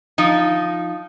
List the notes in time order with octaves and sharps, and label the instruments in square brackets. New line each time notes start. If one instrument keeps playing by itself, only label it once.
[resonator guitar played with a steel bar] F3 D#4